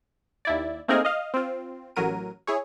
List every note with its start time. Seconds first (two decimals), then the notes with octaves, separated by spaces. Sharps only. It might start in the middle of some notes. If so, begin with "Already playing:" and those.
0.45 D#2 E4 D5
0.88 A3 A#3 C4 D#4 G#4 A#4
1.05 D#5 F5
1.34 C4 F4
1.96 A1 F#3 A#4 D#7
2.47 E4 G#4 C#5